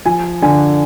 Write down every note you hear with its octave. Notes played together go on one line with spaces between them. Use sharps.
F3 G#5
D3 G#5